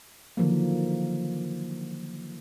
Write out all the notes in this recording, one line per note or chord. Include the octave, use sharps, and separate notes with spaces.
D3 D#3 F3 F#3 A#3